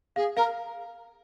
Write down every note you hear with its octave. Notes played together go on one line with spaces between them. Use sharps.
G#4 F5
A#4 F5